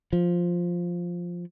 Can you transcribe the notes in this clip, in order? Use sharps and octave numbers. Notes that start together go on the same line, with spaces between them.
F3